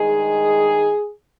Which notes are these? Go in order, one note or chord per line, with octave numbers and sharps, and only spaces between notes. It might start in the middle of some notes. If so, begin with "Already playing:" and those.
Already playing: G2 D#3 G#3 G#4